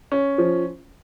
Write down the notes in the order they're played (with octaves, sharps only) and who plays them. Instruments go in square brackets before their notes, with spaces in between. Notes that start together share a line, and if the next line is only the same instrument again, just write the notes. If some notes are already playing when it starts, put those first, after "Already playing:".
[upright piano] C#4
F3